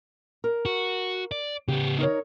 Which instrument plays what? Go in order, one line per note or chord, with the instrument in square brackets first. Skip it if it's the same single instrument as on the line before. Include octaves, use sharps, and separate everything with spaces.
[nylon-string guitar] A#4
[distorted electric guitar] F#4
D5
[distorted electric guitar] C#3 B3 [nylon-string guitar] G4
[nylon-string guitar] D#4 A#4 C#5